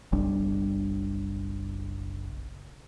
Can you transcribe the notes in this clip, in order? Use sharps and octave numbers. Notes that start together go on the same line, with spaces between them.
F#1 B1 G3 D4